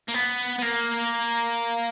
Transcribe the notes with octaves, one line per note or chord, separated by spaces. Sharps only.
A#3
B3
B3
A#3